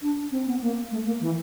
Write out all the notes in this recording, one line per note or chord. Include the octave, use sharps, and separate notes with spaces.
D4
C4
B3
A#3
A3
A#3
E3